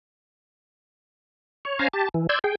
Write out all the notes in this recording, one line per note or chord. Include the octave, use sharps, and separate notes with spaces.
C#5
C#4 C5 F5 G#5 A#5
G4 A5
E3
D5 C6 E6 G6 G#6
G#4 G5